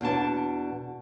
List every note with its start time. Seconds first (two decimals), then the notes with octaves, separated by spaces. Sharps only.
0.01 E2 B2 D4 A5